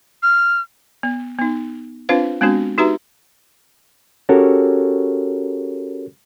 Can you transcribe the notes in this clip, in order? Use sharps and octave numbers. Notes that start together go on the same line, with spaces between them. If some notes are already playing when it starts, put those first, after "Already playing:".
F6
B3
B3 D#4
C4 D4 F4 B4 C5 F5
G#3 B3 C4 D4 F#4
D#4 F#4 G4 B4 E5 A#5
C#4 F#4 G4 A4 A#4 C#5